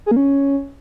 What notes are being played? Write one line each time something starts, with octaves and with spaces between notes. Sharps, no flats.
G#4
A#3
C#4